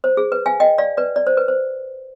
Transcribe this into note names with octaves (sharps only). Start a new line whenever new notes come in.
C5
G#4
B4
F5 G#5
D#5 G5
D5 F5
B4 D5
D5
C5
B4
C5